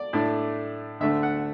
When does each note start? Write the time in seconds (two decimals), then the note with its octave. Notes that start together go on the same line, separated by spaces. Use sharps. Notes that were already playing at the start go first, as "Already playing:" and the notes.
Already playing: D5
0.13 A2 A3 D4
1.00 D2 D3 A3 D4 E5
1.23 F#5